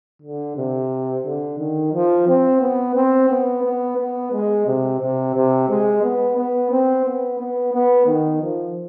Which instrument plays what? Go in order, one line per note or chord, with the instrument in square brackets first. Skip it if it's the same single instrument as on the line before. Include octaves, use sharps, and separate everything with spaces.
[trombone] D3
C3
D3
D#3
F3
C4
B3
C4
B3
B3
B3
G#3
C3
C3
C3
G#3
B3
B3
C4
B3
B3
B3
D#3
F3